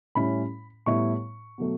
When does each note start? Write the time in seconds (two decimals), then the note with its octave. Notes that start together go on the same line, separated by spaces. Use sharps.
0.15 A2 G3 C#4 E4 B5
0.86 A2 G3 B3 E4 C#6
1.58 B2 F#3 A3